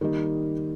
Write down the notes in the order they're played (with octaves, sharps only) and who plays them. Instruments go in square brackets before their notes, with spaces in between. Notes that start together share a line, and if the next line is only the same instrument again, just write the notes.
[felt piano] D#3 G3 A#3 D#4